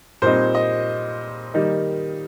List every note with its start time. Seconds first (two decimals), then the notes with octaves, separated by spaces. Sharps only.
0.22 A#2 G3 C4 D#4 C5
0.55 D#5
1.54 D#3 G3 A#3 D#4